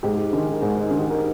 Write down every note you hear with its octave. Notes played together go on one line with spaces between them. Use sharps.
G#2 G4
D#3 G#3
A#4
G#2 G#4
A#4
D#3 G#3
G4
A#4